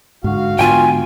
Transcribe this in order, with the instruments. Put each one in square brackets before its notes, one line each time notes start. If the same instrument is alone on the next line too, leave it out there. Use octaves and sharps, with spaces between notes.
[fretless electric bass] G#2 D3 [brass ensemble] F#4 F5
[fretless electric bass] G#2 D3 B3 [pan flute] F4 [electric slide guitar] G5 G#5